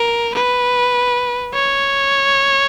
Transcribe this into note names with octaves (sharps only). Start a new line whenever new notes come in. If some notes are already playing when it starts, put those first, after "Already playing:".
Already playing: A#4
B4
C#5